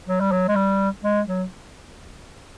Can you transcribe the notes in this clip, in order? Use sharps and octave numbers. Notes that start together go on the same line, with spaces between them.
F#3
G3
F#3
G#3
G3
G#3
F#3